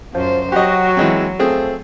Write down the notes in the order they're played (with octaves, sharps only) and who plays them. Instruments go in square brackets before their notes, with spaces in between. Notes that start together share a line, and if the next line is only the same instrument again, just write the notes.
[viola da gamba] F#2 C5 [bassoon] F3
[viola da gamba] F#3 [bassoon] F#4 [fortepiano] G4 D#5
[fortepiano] E3 G#3 C4
[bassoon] F3 [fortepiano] A3 C4 G#4